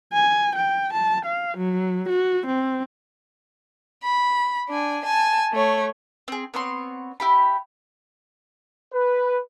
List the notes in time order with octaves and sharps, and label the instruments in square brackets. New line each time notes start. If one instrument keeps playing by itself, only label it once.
[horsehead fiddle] G#5
G5
A5
F5
F#3
F#4
C4
[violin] B5
D4 G#5
G#5 A5
A3 C#5
[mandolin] C4 G#4
B3 C4 C#5 C6
E4 G4 B5
[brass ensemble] B4